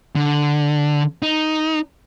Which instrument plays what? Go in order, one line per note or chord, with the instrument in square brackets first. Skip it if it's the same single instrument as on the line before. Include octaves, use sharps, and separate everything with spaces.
[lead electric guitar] D3
D#4